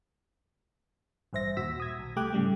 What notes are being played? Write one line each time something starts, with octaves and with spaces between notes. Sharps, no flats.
A1 G2 C5 E5 A#6
D#2 A#2 F#4 E6 B6
D#6 G#6
B1
C2 A3 G4 G5 D6 F#6
G#2 C#3 G3 A3